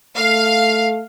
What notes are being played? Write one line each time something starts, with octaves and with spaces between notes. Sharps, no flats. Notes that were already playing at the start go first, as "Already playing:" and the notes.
A3 F5